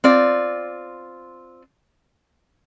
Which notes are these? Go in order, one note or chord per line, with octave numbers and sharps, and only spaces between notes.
C4 F4 D5